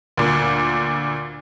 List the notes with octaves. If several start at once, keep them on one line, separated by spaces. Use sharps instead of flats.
D2 A#2